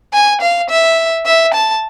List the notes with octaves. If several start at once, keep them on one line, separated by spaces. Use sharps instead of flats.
G#5
F5
E5
E5
A5